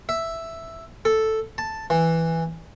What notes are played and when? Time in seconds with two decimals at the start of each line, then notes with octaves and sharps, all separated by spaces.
0.09 E5
1.05 A4
1.58 A5
1.90 E3